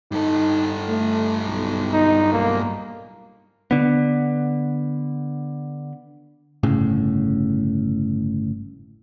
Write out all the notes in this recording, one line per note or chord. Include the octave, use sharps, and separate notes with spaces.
G2 D#4 A4
A3
B1
D#4
B1 A#3
D3 B3
G1 A2 C#3